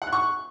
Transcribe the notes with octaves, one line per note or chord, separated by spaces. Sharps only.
F#5
F#6
C#6